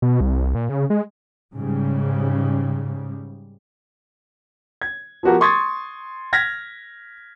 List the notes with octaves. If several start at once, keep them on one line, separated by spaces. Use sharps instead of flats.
B2
C2
A#2
C#3
G#3
G#2 C#3 G3
G#6
F3 B3 F#4 G4 A#4
C6 C#6 D#6 G#6 A6
F6 G#6 A#6 B6